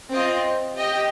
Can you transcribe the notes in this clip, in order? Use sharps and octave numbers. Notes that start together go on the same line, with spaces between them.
C4 F4 D#5
G4 D#5 G5